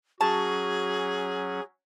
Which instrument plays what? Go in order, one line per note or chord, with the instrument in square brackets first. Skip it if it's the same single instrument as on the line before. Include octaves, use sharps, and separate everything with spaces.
[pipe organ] F#3 C#4 [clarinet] F#4 [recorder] G#4 [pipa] A5